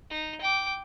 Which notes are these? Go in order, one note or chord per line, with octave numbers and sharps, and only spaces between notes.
D#4
G5 D6